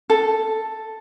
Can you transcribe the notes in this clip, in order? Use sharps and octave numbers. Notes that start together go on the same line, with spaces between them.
A4